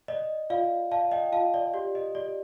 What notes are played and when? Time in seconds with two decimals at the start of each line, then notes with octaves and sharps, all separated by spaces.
0.08 D5 D#5
0.50 F4 D5 F5
0.91 D5 F5 A5
1.11 D#5 G5
1.32 F4 F5 A5
1.54 D5
1.74 G4 D5
1.95 D#5
2.15 G4 D5